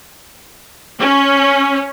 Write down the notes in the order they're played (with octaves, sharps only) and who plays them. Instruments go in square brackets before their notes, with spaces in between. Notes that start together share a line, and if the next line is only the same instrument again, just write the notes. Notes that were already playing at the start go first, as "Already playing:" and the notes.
[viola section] C#4